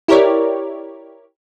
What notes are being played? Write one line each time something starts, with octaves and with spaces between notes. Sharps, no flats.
E4 G4 A#4 C#5 D5